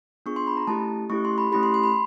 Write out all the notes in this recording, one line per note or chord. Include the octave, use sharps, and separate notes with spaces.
B3 D4 F4 G#4 C#6
C6
B5
A#5
A3 C#4 E4 G4 A5
A3 C#4 E4 G4 C#6
C6
B5
A3 C#4 E4 G4 B5
C6
C6
B5